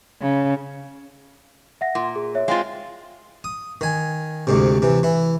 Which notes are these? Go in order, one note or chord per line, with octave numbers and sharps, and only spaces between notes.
C#3
E5 F#5 A#6
A#2
G#4
C#5 E5
G#3 C4 F4 F5 A6
D#6
D#3 G#5
D2 G#2 C3
C3 E3
E3 E4